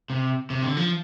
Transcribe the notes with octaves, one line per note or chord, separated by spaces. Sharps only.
C3
C3
D3
F3